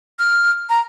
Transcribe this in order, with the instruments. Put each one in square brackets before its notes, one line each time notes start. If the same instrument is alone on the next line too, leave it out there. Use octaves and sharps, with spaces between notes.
[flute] F6
A#5